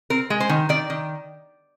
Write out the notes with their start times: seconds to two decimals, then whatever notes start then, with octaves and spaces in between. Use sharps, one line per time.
0.10 C4 A#4
0.30 G#3
0.40 C5
0.49 D#3
0.69 D#3 D5
0.90 D#3